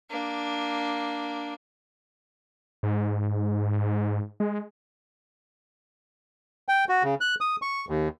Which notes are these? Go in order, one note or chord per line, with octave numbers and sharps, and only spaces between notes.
A#3 D4
G#2
G#3
G5
F#4
C#3
F#6
D#6
C#6
D#2